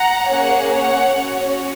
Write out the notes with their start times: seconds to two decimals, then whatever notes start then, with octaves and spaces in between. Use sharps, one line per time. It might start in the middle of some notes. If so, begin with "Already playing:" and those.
Already playing: F#5 A#5
0.30 A#3 C#4 G#4 C#5 F#5
0.72 C#5 F#5
1.16 C#4 F#4 C#5